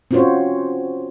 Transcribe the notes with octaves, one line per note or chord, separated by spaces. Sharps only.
C4 C#4 F4 F#4 C5 C#5